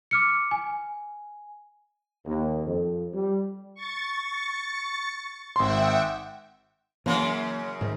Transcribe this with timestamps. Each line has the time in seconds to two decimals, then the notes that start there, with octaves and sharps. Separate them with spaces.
0.11 D6 F6 C#7
0.51 G#5
2.26 D#2
2.65 F2
3.13 G3
3.74 C#6 A6
5.56 G#1 E5 F#5 G5 C6
7.06 F#2 C#3 E3 A#3
7.81 G#2 D#3